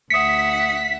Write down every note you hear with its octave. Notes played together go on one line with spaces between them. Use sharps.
D2 E5 F#5 D#6 B6 C#7